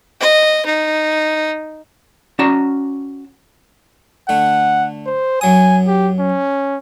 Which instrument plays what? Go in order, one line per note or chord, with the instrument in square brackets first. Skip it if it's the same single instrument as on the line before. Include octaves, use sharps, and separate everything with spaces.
[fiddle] D#5
D#4
[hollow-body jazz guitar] C#4 F#4 D5 A5 A#5
[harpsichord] D3 A3 [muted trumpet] F#5
[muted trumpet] C5
[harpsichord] F#2 F#3 D#6 [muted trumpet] G#5
[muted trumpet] G4
C#4